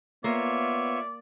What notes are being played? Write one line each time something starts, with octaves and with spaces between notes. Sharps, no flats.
A#3 B3 F4 C#5 D5 E5